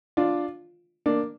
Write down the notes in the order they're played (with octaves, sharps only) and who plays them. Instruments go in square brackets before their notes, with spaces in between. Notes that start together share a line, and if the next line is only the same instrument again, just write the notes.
[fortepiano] D4 F4
A#3 D4